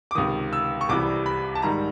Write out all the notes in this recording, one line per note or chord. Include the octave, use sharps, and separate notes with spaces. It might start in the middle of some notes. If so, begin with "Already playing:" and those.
D6
C#2 C3 D#3 D#6
E6
C#6
C2 C3 E3 G3 D6
B5
A5
G#2 D#3 G3 A#5